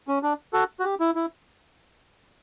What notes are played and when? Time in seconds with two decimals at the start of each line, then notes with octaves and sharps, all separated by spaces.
0.08 C#4
0.23 D4
0.53 F#4 A4
0.80 F#4
0.84 G4
1.00 E4
1.15 E4